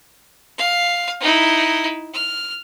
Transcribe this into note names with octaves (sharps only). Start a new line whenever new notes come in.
F5
D#4 E4
F6